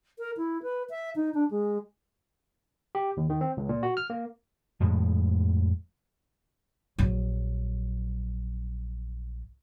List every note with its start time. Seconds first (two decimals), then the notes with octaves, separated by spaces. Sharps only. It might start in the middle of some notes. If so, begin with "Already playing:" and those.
0.19 A#4
0.37 E4
0.63 B4
0.90 E5
1.16 D#4
1.34 D4
1.51 G#3
2.95 G4
3.17 D#2
3.30 D#3
3.41 C4
3.57 C#2
3.69 A#2
3.83 F#4
3.97 F6
4.10 A#3
4.80 F2 A2 F3 G#3
6.99 A#1 F#3